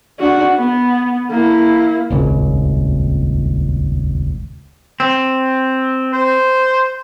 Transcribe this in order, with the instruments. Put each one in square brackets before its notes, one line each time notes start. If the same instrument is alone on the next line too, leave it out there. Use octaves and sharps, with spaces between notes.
[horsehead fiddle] D4 F#4
B3
A#3 E4
[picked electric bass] D#1 G#1 C#2
[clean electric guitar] C4
[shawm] C5